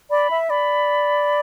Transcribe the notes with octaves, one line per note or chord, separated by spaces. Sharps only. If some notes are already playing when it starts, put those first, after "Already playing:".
D5 B5
E5
D5 B5